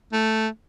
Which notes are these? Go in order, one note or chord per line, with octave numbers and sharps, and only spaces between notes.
A3